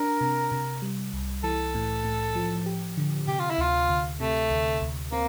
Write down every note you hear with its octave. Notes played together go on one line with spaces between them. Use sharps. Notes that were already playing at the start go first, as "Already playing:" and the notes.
Already playing: D4 A#4
C3
C3
G3
C2
E3 A4
A2
A2
F3
G4
D3
C3 G4
F4
E4
D2 F4
D2
C3 A3
D2
D2
A#3 C4